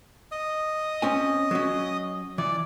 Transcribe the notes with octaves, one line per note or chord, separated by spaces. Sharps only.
D#5 D#6
C4 C#4 G#5
F#3 C#4
E3 D5